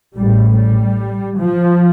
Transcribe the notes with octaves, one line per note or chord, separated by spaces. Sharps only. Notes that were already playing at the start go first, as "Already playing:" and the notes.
A1 A2 G3
G3
F3